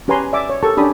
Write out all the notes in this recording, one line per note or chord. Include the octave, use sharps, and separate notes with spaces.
C#4 G4 B4 G#5 A#5 C6
D5 E5 G#5 D6
C#5
G4 A4 A#4 A5 C#6
C#4 D4 G4 A5 B5 D#6